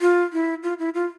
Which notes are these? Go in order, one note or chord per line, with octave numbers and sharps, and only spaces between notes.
F4
E4
F4
E4
F4